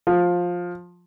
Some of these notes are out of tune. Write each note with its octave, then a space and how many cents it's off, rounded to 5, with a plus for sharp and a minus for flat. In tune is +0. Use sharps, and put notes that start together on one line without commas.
F3 +15